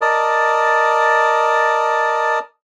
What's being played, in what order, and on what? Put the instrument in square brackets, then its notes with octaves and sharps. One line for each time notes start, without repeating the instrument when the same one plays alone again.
[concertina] A#4 D5 D#5 A5